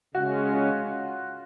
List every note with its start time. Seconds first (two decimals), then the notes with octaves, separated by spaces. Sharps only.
0.14 C#3 G#3 C#4 F#4
0.53 F4